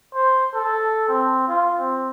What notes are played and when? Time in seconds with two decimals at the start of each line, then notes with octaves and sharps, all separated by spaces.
0.14 C5
0.54 A4
1.08 C4
1.48 F4
1.79 C4